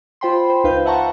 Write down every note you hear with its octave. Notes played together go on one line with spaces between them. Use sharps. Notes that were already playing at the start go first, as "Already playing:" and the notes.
F4 C5 G5 B5 C6
C5
C#2 D#4 B4 F5 G6
E5 F#5 A5 A#5 C#6